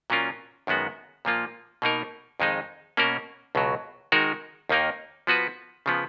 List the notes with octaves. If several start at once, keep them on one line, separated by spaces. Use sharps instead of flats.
A#2 F#3 C#4 F4 A#4
F#2 D#3 G#3 B3 F#4
A#2 F3 A#3 F4
B2 A#3 D#4 A#4
F2 D#3 G#3 D#4
B2 A#3 C#4 F#4 A#4
C#2 B2 F#3
D#3 G#3 D#4 F#4 A#4
D#2 D#3 A#3 D#4 A#4
F3 B3 F#4 B4
C#3 F3 B3